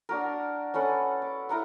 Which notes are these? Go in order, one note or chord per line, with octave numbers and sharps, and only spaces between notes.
D4 F#4 A#4
C#4 A4 B4 F#5
D6
E4 A#4 F#5 A#5